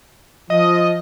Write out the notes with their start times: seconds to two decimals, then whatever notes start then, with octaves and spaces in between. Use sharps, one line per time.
0.50 F3 D#5